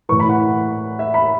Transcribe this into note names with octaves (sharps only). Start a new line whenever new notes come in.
A2 E3 C#6
B5
F#5
E5
B5